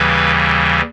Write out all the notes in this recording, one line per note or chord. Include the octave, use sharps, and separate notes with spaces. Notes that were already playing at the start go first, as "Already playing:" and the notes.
Already playing: D#2 C#3 E3 G3 B4